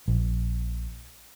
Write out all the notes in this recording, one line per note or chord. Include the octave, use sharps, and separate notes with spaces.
A#1